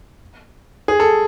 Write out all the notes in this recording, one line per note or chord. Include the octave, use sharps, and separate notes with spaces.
G#4
A4